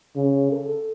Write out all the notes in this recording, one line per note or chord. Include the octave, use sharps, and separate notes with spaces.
C#3
A4